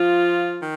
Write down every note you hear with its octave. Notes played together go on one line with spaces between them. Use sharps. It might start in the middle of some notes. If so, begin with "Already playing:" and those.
Already playing: F3 F4
D#3